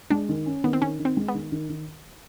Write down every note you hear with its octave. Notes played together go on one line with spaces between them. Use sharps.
G#3 D4
D#3
C#4
D#3 B3
C4
D#3 C#4
D#3
C4
G#3
B3
D#3
D#3
D#3